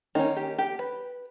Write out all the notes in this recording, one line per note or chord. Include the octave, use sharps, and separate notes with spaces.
D#3 A#3 C#4 D#4
G4
G4
B4